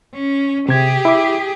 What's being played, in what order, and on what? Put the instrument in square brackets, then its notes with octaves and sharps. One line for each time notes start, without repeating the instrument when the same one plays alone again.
[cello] C#4
[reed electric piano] C3 G#6 [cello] G4 G#4
[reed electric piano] E4 D6